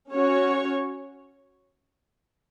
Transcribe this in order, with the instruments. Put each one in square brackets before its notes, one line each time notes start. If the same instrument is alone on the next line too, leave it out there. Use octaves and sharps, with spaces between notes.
[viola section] C#4 F#4 C#5